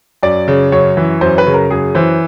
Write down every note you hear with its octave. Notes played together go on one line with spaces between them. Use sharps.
F#2 D5
C#3
F#2 C#5
E3
F#2 C5
B4
C#3
A#4
F#2 G#4
E3 C5